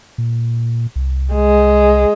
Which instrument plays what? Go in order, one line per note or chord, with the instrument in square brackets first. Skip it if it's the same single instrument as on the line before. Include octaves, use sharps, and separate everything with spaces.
[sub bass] A#2
C2
[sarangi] G#3